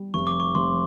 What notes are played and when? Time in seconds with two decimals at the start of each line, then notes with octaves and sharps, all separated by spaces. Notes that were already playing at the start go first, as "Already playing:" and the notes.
Already playing: G3
0.14 F1 C#6
0.27 D6
0.40 C#6
0.55 F1 C6